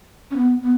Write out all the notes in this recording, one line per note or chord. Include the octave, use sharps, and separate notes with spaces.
C#4
B3
B3